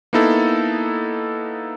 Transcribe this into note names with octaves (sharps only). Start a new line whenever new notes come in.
A#3 B3 D#4 E4 A4